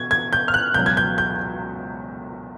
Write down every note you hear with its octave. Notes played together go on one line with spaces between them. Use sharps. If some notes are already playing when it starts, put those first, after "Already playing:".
Already playing: B2 G#6
G#6
G6
F6
F#6
C#2 B2 F#3 G6
G#6
G6
G6